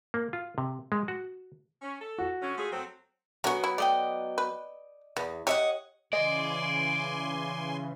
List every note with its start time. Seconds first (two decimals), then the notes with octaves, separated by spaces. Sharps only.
0.14 A#3
0.33 F4
0.58 C3
0.92 G#3
1.08 F#4
1.82 C#4
2.00 A4
2.18 F#4
2.42 D3 F#3 C#4
2.57 A3 F4 G#4
2.72 F#3 A3 C4
3.44 D3 F#3 B3 C#4 F#4
3.64 E4
3.78 A3 D5 D#5 G5
4.38 B4
5.17 E2 B3
5.47 G4 C#5 D#5 E5 F#5
6.13 C#3 E3 D5 D#5 G#5 C6